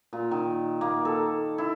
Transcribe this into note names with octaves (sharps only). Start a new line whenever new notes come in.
A#2
D#3
A#3
A4
E4